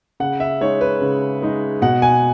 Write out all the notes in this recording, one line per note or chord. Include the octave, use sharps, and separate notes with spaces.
C#3 F#5
E5
G#3 D#4 C#5
B4
C#3
G#3 D#4
B2 F#5
G#5